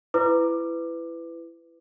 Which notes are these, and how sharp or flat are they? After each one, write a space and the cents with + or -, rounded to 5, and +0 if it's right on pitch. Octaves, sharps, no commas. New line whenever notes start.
E4 +20 B4 +20 D6 +15